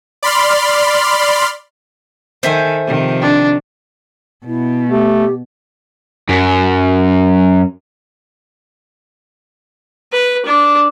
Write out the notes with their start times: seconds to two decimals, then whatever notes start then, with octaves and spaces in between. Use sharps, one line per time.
0.23 D5 B5 C6 F6
2.43 D#3 A4 C5 E5 G#5
2.87 C3 D#3 F3
3.21 D4
4.46 B2 E4
4.89 A3 G4
6.29 F#2
10.12 B4
10.46 D4